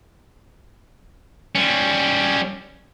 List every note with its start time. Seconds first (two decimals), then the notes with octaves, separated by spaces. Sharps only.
1.56 G3 C#4